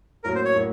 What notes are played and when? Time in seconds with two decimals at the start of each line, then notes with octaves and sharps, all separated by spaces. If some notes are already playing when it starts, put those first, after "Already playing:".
0.24 A2 F#3 A#3 C#4 A#4
0.35 C5
0.45 C#5
0.55 A2 F#3 A#3